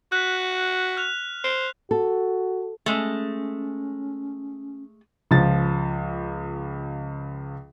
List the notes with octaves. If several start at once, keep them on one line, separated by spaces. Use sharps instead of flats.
F#4 F#6 B6
F6 F#6 F7
C5
F#4 A4
G#3 A3 C#4
C#2 F3 A6